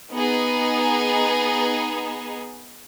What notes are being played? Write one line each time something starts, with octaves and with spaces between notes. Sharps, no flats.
B3 D#4 G#4